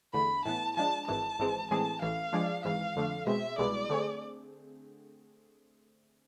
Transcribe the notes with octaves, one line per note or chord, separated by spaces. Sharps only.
E2 D3 A3 B5
A2 E3 B3 A5
F3 G#3 D4 A5
G#1 G#2 E3 G#3 A5
G#1 G#2 E3 G#3 C4
A2 E3 G#3 C4 G#4 A5
A1 A2 E3 F5
F3 G#3 D4 G#4 D5
G#1 G#2 E3 F5
F2 D3 A3 D4
B2 G#3 C4 E5
C2 B2 G#3 B3 E4 D5
D3 A3 C4 G#4